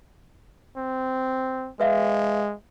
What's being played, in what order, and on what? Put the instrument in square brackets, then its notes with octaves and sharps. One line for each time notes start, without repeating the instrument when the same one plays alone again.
[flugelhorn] C4
[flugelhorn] G#3 [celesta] B4 E5 F5